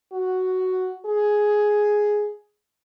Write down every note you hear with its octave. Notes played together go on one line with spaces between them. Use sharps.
F#4
G#4